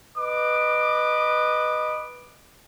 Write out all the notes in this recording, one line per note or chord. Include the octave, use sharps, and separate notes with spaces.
B4 D#5 D6